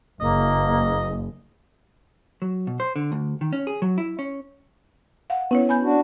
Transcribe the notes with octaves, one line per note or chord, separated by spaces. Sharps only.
F#1 A#3 D#5
F#3
B2
C5
D3
D2
D#3
C#4
G#4
F#3
E4
C#4
F5 F#5
B3 C#4 E4 C#5
G#5 B5 G6
D4 F#4